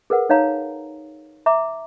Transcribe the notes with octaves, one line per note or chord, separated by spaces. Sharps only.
G#4 A#4 B4 F#5
D#4 C#5 F5 A#5
E5 A#5 D6